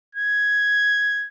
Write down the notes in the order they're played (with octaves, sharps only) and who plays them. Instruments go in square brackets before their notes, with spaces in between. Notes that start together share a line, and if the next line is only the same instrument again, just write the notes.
[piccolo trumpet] G#6